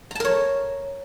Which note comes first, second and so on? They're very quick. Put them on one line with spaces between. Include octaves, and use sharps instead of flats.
A#5 A5 A#4 C#5